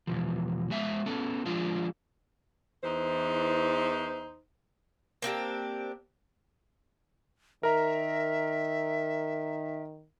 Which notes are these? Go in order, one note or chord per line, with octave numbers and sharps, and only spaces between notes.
E2 G#2 B2 F3
G#3 F#4 E5 F5
B3 C#4 A4
F3 G#3 D4 F4
E2 E3 D#4 C5
A#3 C4 D4 G4
D#3 A#4 E5 A#5